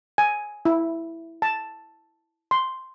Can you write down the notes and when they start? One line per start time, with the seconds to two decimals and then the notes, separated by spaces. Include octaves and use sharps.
0.18 G#5
0.65 E4
1.42 A5
2.51 C6